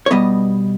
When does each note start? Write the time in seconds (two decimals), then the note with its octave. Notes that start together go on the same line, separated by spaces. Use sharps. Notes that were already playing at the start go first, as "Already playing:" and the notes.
0.06 C#5
0.11 B2 G3 B3 D#5